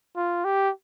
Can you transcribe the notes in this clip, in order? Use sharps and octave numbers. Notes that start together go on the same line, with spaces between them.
F4
G4